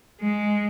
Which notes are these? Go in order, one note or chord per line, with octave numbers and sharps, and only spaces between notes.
G#3